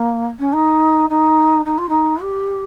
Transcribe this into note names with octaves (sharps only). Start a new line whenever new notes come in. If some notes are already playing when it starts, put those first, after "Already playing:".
Already playing: A#3
C#4
D#4
D#4
D#4
F4
D#4
G4